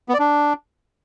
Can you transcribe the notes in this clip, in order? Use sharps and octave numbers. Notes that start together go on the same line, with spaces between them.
B3
D5
D4